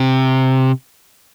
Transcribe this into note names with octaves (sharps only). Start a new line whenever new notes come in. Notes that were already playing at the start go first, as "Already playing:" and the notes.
Already playing: C3